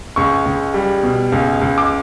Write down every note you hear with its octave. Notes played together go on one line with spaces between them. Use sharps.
C#2 C#6
C#2
G3
B2
C#2
C#2
D6